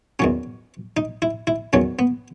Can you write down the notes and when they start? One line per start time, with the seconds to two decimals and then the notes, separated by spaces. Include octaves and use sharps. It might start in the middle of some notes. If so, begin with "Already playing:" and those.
0.19 E2 D#3 F#3 C#4
0.97 D#4
1.22 E4
1.47 E4
1.73 E2 D#3 F#3 C#4
1.99 B3